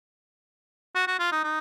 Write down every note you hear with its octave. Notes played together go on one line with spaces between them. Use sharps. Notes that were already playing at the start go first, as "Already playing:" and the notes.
F#4
F#4
F4
D#4
D#4